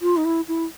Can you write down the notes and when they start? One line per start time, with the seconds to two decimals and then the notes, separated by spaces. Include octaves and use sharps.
0.02 F4
0.17 D#4
0.25 E4
0.48 E4